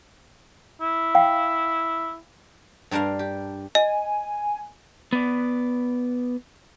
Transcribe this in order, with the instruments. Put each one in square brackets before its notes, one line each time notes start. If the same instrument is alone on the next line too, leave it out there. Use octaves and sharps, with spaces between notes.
[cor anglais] E4
[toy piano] F5 G5
[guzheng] G2 G3 D4 A#4 F5
G4
[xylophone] D#5 [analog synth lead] G#5
[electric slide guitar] B3 D5